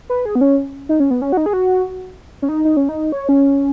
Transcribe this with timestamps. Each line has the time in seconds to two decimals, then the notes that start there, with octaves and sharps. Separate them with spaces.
0.10 B4
0.25 G#4
0.35 B3
0.41 C#4
0.89 D#4
1.00 C#4
1.11 B3
1.22 C#4
1.32 F#4
1.37 D#4
1.46 G#4
1.53 F#4
2.42 C#4
2.49 D#4
2.65 D#4
2.77 C#4
2.89 D#4
3.12 C#5
3.29 C#4